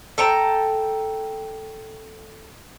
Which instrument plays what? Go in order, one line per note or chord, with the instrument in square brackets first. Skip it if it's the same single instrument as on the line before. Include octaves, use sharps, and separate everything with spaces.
[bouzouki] A4 G5 A#5